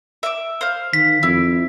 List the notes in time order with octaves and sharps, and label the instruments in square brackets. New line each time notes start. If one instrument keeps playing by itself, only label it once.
[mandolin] E5 D6
C5 F5
[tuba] D#3 [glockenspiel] B6
[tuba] F2 [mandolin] E4